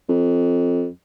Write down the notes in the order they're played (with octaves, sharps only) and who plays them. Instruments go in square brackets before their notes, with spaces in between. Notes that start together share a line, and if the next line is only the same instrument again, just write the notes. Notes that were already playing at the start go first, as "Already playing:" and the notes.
[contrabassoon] F2